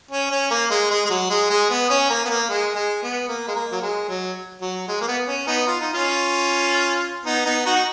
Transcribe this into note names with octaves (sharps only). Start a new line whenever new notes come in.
C#4
C#4
A#3
G#3
G#3
G#3
F#3
G#3
G#3
B3
C#4
A#3
B3
A#3
G#3
G#3
B3
A#3
G#3
A#3
F#3
G#3
F#3
F#3
G#3
A#3
B3
C#4
B3 D#4
F4
D#4
C#4 F4
B3 D#4
B3 D#4
D#4 F#4